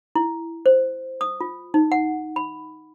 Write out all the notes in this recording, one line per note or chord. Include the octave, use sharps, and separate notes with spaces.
E4
C5
D#6
F4
D#4
F#5
B5